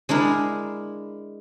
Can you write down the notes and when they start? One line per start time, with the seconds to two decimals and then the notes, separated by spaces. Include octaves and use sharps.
0.09 G#3 D4 E4 A#4